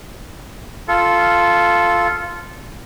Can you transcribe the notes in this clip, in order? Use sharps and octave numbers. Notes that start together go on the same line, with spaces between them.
F4 A4